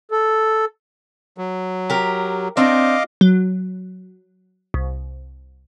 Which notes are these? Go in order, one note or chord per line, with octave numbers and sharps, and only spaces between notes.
A4
F#3
G4 A#4
C4 D4 D#5 F5 G5 D6
F#3
C2